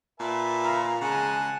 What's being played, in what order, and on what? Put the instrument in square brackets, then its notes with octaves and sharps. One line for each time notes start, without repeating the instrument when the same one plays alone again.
[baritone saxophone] A#2 [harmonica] B4 E5 A5
[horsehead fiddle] F5 [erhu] A#5
[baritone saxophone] C#3 [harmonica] G#3 F#5 [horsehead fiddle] G#5 A5